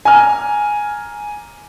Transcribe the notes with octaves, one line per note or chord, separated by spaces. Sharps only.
G#5 A#5 F6